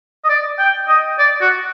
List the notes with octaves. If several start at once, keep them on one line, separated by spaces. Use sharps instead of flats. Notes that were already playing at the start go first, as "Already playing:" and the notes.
D#5
D5
G5
D#5
D5
F#4